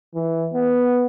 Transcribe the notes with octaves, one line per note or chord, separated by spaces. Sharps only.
E3
B3